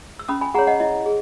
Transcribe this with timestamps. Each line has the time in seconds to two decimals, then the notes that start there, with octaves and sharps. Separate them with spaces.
0.19 E6
0.28 C#4 B5 D#6
0.41 G#5 B5
0.54 G#4 C#5 F#5 A#5
0.67 D#5 F#5
0.80 E4 D#5
1.06 G#4